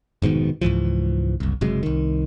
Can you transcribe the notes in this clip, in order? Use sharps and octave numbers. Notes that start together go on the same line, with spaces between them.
F1 G#2 B2 D#3
C#2 G#2 E3 F3
F#1 C2
F#1 C3 F#3 G#3
C2 D#3